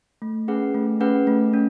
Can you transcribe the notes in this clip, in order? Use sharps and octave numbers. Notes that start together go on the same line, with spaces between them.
A3
C#4 G#4 B4 F#5
A3
C#4 G#4 B4 F#5
A3
C#4